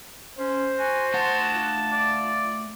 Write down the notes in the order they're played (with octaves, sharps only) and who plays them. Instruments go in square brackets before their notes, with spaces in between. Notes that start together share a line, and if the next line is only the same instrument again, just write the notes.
[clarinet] C#4 [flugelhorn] C5
[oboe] F#4 [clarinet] G#5
[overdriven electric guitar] A3 F#5 [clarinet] A5
[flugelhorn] F4
[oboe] D5